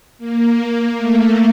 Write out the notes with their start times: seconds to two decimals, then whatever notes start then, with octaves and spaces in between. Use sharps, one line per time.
0.18 A#3
0.94 A3